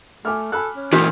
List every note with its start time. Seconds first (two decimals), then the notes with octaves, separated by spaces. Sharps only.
0.25 A3 G#5 D6 F6
0.52 A4 G#5 B5 F#6
0.76 C#4
0.93 A#2 E3 F#4 A#4 D6 D#6 G6